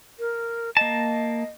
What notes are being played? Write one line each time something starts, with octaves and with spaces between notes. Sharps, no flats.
A#4
A#3 D#5 A5